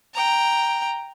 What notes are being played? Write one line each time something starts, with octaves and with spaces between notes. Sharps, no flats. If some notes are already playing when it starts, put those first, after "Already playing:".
G5 A#5